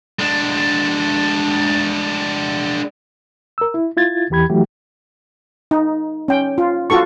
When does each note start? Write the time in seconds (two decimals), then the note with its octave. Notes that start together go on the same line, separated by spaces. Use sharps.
0.19 G#3 D4
3.58 A#4 E6
3.74 E4
3.97 E4 F4 G#6 A6
4.30 E2 E3 G4 B5 G#6
4.50 E3 F#3 A3 E4 F#4 G4
5.71 D#4
6.28 C#4 G5
6.58 F4
6.90 F4 F#4 A4 C#6